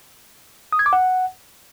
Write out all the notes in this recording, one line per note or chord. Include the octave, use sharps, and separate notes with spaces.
D#6
G#6
D6
F#5